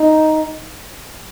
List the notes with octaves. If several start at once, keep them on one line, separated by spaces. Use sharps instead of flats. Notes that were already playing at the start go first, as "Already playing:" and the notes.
Already playing: D#4